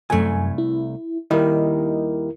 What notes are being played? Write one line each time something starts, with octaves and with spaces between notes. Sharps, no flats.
C2 F#2 A3 G#5
E4
D#2 D#3 G3 E4 A#4 D#5